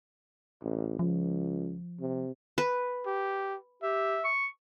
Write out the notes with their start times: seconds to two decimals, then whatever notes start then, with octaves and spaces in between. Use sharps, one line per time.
0.63 A1
0.99 C#2 F3
2.00 C3
2.58 B4
3.06 G4
3.83 G4 E5
4.25 C#6